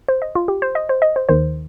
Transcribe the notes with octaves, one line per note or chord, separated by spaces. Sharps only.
C5
D#5
F4
G4
C5
D#5
C5
D#5
C5
D#2 D#3 C5